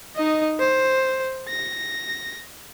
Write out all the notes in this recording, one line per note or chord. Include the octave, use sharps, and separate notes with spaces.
D#4 D#5
C5
A#6